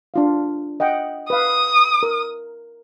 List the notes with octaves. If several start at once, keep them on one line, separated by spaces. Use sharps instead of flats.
D4 F4 F5
D#5 F#5 G5
B4 F5 D#6
A#4